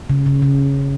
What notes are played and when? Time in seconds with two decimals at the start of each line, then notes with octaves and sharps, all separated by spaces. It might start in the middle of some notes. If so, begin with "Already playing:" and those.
0.10 C#3
0.26 C#3
0.42 C#3